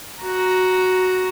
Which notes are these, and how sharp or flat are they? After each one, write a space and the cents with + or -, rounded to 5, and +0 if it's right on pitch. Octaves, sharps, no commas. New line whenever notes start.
F#4 +0 A#5 +5